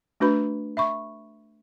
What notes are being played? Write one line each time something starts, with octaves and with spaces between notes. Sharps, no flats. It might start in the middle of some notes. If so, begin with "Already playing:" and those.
A3 D4 F#4 B4 B5
E5 B5 C#6